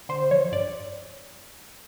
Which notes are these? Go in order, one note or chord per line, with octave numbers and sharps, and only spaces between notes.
D3 C5
F3 C#5
G2 D5